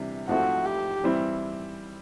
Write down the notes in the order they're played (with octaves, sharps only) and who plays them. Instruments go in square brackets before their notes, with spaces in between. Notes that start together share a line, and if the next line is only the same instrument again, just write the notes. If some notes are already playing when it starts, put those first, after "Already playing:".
Already playing: [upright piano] C3 E3 G3 D4
[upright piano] G#2 F3 A3 C4 E4 [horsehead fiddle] F#4
[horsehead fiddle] G4
[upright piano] E3 G3 C4 E4